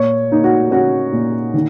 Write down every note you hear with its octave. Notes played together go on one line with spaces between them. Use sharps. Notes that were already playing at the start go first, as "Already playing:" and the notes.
Already playing: A#2 C#5
A#3 D#4
F#4
C#4 F#4
A#2
D#3